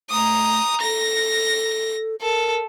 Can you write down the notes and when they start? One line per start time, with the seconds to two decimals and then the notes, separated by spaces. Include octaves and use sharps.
0.10 A3 A#5 D#6
0.81 A4 A#6
2.21 A4 A#4